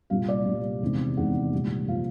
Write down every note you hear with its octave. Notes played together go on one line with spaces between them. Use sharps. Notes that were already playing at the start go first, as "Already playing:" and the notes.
C2 A#2 G3 F5
D5
C2 A#2 G3
E2 C3 D#3 G#3 C4
E2 C3 D#3 G#3 C4 F#5
C2 A#2 F3 G#3
A#2 F3 G#3 F5